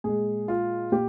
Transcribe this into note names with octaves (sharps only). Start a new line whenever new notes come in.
A#2 G#3 G#4
F4
A#2 G4